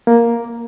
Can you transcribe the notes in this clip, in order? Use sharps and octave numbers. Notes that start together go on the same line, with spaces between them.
A#3